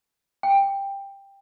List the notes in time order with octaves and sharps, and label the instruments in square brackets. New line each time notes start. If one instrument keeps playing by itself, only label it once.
[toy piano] G5